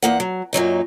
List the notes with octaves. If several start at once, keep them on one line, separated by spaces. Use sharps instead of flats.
E2 A#3 F#5
F#3
F#2 A#2 F#3 D#4